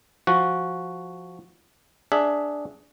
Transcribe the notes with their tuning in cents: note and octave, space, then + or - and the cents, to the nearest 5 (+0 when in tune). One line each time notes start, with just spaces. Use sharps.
F3 +0 F#4 +0
D4 +0 G#4 +10 E5 +0